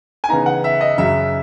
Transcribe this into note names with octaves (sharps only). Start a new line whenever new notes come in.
G#5
C#3 E3 B3 D#4 A#5
F#5
E5
D#5
F#2 C#3 F#3 E5